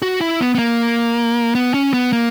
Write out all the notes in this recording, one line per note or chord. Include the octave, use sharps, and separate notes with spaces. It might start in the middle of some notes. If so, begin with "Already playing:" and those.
F#4
E4
B3
B3
A#3
B3
C#4
B3
A#3